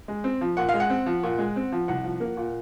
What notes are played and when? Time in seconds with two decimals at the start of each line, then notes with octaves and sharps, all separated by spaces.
0.08 G#3
0.24 C4
0.41 F3
0.57 A#2 F#5
0.69 F5
0.74 G#3
0.80 F#5
0.90 C4
1.06 F3
1.23 A#2
1.39 G#3
1.56 C4
1.72 F3
1.88 C2 F#5
2.04 F3
2.20 A#3
2.37 A#2